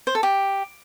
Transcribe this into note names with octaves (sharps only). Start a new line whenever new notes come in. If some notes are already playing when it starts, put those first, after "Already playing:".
C5
A4
G4